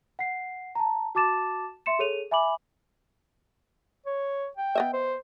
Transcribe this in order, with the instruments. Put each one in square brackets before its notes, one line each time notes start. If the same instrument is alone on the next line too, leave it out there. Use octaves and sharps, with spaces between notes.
[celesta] F#5 C7
A5 A#5
F#4 A5 D6 A6 E7
E5 C6 C#7 E7
G#4 A4 C#5 D#7 F7
E5 G#5 B5 D6 F#7
[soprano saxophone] C#5
G5
[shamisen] B3 D#5 E5
[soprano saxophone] C5